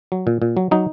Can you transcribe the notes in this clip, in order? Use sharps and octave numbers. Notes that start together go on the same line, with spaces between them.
F#3
A#2
A#2
F#3
F#3 D#4